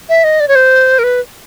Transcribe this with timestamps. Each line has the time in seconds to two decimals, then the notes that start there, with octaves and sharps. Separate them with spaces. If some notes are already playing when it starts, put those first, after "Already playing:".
0.09 E5
0.24 D#5
0.40 D5
0.48 C#5
0.55 C5
0.99 A#4
1.04 B4